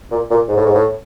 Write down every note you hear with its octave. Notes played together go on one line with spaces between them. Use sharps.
A#2
A#2
G#2
A2
G#2
A2